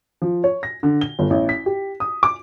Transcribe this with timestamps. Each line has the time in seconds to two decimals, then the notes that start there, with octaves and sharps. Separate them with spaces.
0.22 F3
0.44 C#5
0.63 A#6
0.83 D3
1.01 G7
1.19 G1
1.30 A1
1.49 B6
1.66 G4
2.00 D#6
2.23 D6